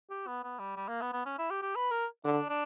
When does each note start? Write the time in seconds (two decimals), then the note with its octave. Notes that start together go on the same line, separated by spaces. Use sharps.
0.10 G4
0.27 B3
0.44 B3
0.59 G3
0.76 G3
0.88 A#3
1.01 B3
1.13 B3
1.26 C#4
1.38 E4
1.50 G4
1.62 G4
1.76 B4
1.91 A#4
2.24 D3 D4
2.49 D4